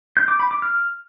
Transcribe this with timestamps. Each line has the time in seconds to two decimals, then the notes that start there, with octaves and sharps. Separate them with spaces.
0.17 G6
0.28 D6
0.39 B5
0.51 D6
0.62 F6